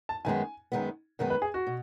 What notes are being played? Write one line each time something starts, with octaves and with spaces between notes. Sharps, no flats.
A5
F#2 D#3 G#3 B3 G#5
F#2 D#3 G#3 B3
F#2 D#3 G#3 B3
B4
G#4
F#4
B2